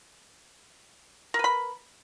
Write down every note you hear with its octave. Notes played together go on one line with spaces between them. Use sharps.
A#4 B4 B5